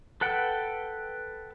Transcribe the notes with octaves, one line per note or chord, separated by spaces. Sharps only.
A4 B4 F#5 G5